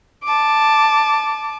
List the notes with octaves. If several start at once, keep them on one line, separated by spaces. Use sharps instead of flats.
A5 D6